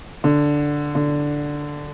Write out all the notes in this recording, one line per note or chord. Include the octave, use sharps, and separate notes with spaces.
D3
D3